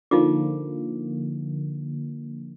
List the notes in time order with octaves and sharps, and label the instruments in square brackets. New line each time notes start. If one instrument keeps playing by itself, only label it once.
[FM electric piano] D3 F3 A#3 [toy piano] D#4 F4 D6